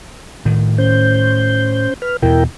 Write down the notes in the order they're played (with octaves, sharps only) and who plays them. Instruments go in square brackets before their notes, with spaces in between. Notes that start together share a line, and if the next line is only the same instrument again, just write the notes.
[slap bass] A2 D#3
[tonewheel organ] C#4 C5 G6
B4 F6
[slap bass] E2 B2 [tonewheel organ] E4 A#4 G5